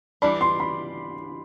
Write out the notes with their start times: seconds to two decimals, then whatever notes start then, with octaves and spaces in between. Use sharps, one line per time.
0.22 E3 G3 D4 B5
0.41 C6
0.60 B5